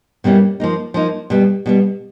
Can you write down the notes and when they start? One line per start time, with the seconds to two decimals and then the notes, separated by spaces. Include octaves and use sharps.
0.24 B2 G3 A#3 C#4 E4
0.60 F3 A#3 D#4
0.94 F3 A#3 D#4
1.30 B2 G3 B3
1.66 B2 G3 B3